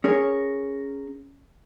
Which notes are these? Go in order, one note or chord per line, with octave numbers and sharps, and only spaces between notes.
C#4 G#4 A#4 C#5